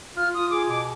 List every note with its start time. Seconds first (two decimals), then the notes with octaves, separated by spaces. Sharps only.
0.17 F4 F6
0.35 F4 D#6
0.51 G#4 D6
0.68 B2 D6